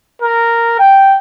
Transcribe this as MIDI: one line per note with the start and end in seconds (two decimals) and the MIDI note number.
0.22 0.75 70
0.79 1.17 79